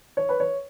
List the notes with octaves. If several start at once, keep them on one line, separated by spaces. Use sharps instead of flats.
C#5
B4
C#5